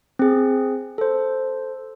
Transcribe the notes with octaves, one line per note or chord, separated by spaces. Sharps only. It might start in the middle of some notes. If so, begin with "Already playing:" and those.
C4 G#4
A4 C5